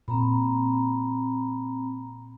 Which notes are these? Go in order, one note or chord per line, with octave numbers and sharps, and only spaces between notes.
A#2 C4 A#5 B5